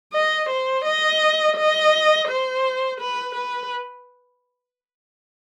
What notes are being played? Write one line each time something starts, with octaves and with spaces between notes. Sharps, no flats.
D#5
C5
D#5
D#5
C5
B4
B4